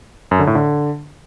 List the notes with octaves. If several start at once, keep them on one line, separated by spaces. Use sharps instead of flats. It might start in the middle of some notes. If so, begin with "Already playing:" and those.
F#2
D3
A2
D3